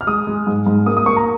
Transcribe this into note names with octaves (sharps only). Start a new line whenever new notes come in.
F6
G#3 D#6
G#3
G#2
G#2
A#3 D#6
D#6
A#3 C#6
A#5